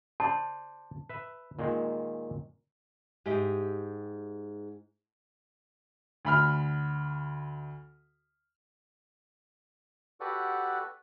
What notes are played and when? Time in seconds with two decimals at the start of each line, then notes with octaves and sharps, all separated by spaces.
0.20 C5 D5 A5
1.09 B4 E5
1.59 A#2 D#3 G#3
3.26 G#2 G4 D#5 E5
6.25 D2 B5 F6
10.20 F#4 G4 A4 B4 D5 F#5